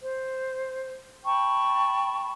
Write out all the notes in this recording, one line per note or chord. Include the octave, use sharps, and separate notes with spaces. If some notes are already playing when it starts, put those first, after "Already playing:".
C5
G5 A5 B5 C#6